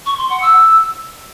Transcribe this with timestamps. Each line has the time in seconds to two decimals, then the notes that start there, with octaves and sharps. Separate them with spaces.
0.06 C#6
0.18 C6
0.30 F#5
0.42 E6